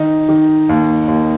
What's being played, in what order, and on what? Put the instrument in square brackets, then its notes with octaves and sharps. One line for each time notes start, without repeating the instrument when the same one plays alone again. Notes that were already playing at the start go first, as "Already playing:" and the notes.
Already playing: [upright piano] D#3 D#4
D#3
D#2
D#2